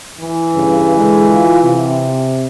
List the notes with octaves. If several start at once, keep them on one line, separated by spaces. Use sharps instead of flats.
E3
G2 C#3
D3 G#3
F4
C3